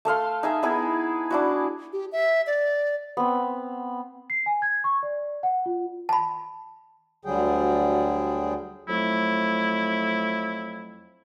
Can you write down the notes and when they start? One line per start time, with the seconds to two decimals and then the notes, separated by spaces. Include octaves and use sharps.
0.05 A3 A4 F5 C6
0.43 D#4 G#4 E5
0.63 B3 D#4 E4 G#4
1.31 D4 E4 F#4
1.93 G4
2.12 E5
2.47 D5
3.17 B3 C4
4.30 C7
4.46 G#5
4.62 G#6
4.84 C#6
5.03 D5
5.43 F#5
5.66 F4
6.09 A5 B5
7.25 D2 D3 F#3 G3 G#4 G5
8.89 F2 F#3 A3 E4